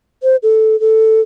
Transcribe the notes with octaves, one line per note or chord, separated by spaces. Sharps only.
C5
A4
A4